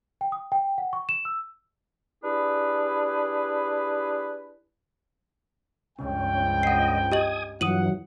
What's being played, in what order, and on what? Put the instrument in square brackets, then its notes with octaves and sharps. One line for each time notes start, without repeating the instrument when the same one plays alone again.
[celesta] G5
D#6
G5
F#5
C#6
E7
E6
[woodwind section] D4 E4 G4 G#4 B4
[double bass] C#2 G2 [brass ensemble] F3 G5 [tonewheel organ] C#4
[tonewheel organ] D#5 [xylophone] F#5 C7
[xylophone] G4 D#5 F#7 [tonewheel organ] G#5 D#6
[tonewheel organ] G2 E3 F#3 [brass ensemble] F4 F#5 [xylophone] D#6 D#7 F#7